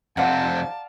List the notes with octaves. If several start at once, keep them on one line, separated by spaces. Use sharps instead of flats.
F2 C3 C4 D5 F5 F#5 A5 A#5